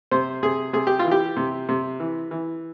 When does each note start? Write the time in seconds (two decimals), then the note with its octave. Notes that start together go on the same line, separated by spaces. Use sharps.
0.11 C3 C5
0.43 C3 G#4
0.73 C3 G#4
0.87 G4
0.99 F4
1.05 E3
1.11 G4
1.37 C3
1.69 C3
2.00 E3
2.31 E3